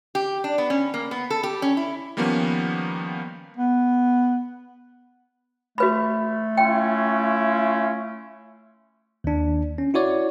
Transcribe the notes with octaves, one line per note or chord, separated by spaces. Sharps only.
G4
D4
B3
C#4
A#3
B3
A4
G4
C#4
E4
D#3 F3 G3 A#3 B3 C#4
B3
A3 F#4 B4 B5
C#4 E4 F4 G5
D#2 D4
C#4
E4 F#4 C#5 D5